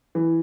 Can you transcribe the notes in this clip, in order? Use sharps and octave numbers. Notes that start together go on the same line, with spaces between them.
E3